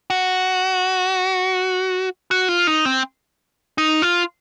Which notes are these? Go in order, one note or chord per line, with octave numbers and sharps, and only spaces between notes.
F#4
F#4
F4
D#4
C4
D#4
F4